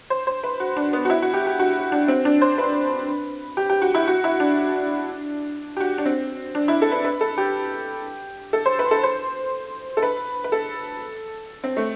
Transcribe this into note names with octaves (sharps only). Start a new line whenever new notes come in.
C5
C5
B4
F#4
D4
B3
F#4
E4
F#4
G4
G4
F#4
D4
C4
D4
C5
B4
G4
G4
F#4
E4
F#4
E4
D4
G4
F#4
D4
C4
D4
E4
A4
B4
B4
A4
G4
A4
C5
B4
A4
C5
A4
B4
B4
A4
C4
A3